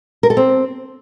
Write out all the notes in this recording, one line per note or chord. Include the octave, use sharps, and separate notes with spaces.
A#4
A4
C4